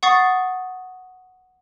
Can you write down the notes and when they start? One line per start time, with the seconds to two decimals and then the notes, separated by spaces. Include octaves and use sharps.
0.03 F#5 C#6 D#6 A6 C7